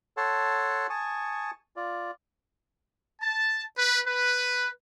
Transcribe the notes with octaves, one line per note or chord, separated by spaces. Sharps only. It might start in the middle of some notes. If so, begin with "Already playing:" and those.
A4 C#5 F#5 A5 C6
G#5 A5 C#6 D#6
F4 D5
A5
B4
B4